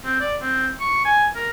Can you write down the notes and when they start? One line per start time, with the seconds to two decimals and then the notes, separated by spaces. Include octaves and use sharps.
0.04 C4
0.20 D5
0.41 C4
0.80 C#6
1.05 G#5
1.35 A#4